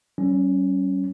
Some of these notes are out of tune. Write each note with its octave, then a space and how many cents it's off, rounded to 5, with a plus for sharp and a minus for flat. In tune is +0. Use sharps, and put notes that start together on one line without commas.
G3 -40 C#4 +0